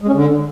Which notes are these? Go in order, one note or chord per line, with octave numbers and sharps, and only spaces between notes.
G#3
C#4
D3